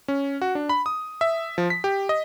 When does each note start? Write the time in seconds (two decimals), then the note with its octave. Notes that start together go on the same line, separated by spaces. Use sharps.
0.08 C#4
0.42 F#4
0.55 D4
0.69 B5
0.86 D#6
1.21 E5
1.58 F3
1.70 B6
1.84 G4
2.09 D#5